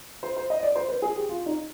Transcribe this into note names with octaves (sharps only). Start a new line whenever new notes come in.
C5
C5
D#5
D5
C5
B4
G#4
G4
F4
D#4